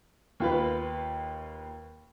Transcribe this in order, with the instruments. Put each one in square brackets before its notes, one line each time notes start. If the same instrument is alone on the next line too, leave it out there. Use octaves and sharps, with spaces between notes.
[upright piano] D#2 F4 B4